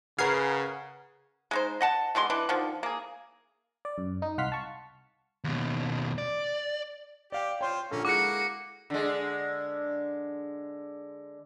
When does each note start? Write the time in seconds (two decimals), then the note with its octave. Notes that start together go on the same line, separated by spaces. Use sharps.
0.18 C#3 G#4 A#4 B4 F#5 F6 G#6 C7
1.51 G#3 D#4 C5
1.81 D#5 F#5 A5
2.15 B2 D3 G#3 C6
2.30 E3 D4 B4
2.49 D3 D#3 F3
2.83 A#3 G#4
3.85 D5
3.98 F#2
4.22 D#4
4.38 C2 F5 F#5 C6 F6 B6
4.52 A5 C#6
5.44 D#2 B2
6.18 D5
7.32 G4 D5 F5 G5
7.61 F4 C5 C#5 G5 C6
7.91 A#1 D3 A#3 C#4 A4
8.05 G#3 A#3 E4 F#4 F#5 D6 F#6 C#7
8.90 D3 G#3